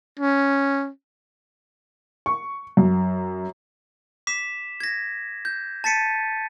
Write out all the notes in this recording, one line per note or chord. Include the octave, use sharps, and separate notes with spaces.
C#4
C#6
F#2
D6 B6 E7
G#6 A#6
G6
A5 A6 B6 C#7 D#7